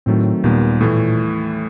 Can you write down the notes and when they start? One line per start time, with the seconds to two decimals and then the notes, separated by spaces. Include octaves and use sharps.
0.06 A2 D#3 F#3 A3 C4
0.44 D#2 A#2 D#3 G3 B3
0.81 A2 E3 A3